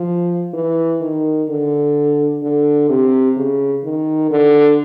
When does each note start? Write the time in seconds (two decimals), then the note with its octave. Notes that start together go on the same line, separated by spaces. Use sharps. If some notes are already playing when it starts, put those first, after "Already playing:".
Already playing: F3
0.54 E3
1.01 D#3
1.49 D3
2.43 D3
2.89 C3
3.37 C#3
3.84 D#3
4.31 D3